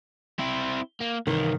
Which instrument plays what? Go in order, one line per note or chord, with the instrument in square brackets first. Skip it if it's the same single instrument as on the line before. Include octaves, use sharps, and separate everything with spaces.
[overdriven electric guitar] C4 E4
A#3
[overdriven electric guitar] C2 E3 [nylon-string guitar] D#3